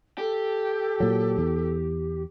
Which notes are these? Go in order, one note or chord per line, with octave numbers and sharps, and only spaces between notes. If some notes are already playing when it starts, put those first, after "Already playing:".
G4 A4
A#2 F#3
E2